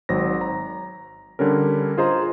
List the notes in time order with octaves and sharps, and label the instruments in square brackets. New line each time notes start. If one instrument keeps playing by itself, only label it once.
[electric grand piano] G#1 F#3 C5 A#6
A#5
D3 G3 C#4 A#4
F4 G#4 C5 D#5 A#5 C6